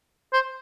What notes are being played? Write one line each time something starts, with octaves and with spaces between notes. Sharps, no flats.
C5